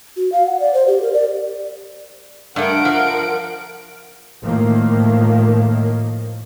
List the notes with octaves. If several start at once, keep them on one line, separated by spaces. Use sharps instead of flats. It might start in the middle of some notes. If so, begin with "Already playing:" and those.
F#4
F5
F#5
D5
C5
G4
A#4
D5
G2 A3 A#4 F#5 D7
F3
A2 D#3 F3 A3 A#3